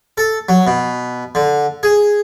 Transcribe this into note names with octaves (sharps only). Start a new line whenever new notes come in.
A4
F#3
B2
D3
G#4